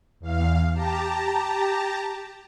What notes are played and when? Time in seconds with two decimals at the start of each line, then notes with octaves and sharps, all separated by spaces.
0.20 E2 F5
0.73 G4 A5 A#5